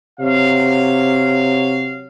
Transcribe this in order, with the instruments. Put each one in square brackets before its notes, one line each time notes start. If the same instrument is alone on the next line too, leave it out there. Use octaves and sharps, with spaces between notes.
[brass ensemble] C3 F#3 C#5 F5